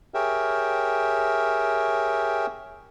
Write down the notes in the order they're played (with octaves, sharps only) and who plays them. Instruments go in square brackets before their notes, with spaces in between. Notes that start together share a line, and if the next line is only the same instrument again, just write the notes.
[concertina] G4 G#4 A#4 C#5 E5 G5